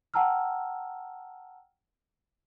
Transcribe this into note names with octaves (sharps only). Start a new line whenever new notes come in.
F#5 G5 A5 A#5 E6 F6